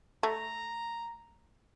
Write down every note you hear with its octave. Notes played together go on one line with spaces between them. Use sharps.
A3 A#5